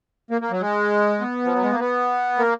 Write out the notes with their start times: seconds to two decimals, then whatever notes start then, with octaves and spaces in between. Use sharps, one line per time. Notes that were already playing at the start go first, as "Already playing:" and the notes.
0.31 A#3
0.41 A#3
0.51 F#3
0.61 G#3
1.21 B3
1.45 F3
1.54 F#3
1.63 G#3
1.71 A#3
1.80 B3
2.38 A#3